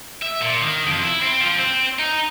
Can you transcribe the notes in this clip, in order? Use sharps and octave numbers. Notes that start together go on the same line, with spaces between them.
E5
A#2
D#3
F2
E4
C4
F3
C4
D#4